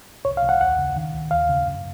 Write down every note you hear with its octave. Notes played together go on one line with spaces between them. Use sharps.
C2 C#5
F5
C2
F#5
D#2 F#5
C#3
D#3
C#2
D#2 F5
C#3
F#2